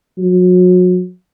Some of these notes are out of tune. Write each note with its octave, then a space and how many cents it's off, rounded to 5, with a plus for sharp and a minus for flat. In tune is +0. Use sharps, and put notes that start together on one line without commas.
F#3 -35